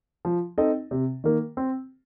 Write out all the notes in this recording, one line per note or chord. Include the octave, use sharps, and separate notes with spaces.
F3
C4 D#4 A4 D#5
C3
D#3 A#3
C4